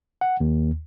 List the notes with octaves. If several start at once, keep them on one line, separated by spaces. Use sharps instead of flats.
F#5
D#2